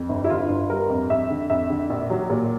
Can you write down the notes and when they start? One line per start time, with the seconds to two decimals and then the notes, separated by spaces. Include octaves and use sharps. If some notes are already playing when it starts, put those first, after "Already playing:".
Already playing: F2
0.09 G1
0.24 E4
0.30 D3 F4
0.49 G1
0.69 G3 A#4
0.90 F2
1.10 F2 E5
1.30 D3
1.50 F2 E5
1.70 D3
1.90 A#1
2.10 F#3
2.30 A#2